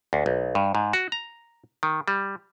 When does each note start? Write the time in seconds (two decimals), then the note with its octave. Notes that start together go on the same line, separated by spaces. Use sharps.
0.13 D2
0.26 B1
0.55 G2
0.75 G#2
0.93 F#4
1.12 A#5
1.83 D#3
2.08 G3